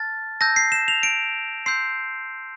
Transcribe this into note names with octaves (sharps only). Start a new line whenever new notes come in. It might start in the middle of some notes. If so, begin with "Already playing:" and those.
Already playing: A5 F6 A6
A5 E6 G6 A#6
C7
E7
F7
D7
C6 E6 G6 C7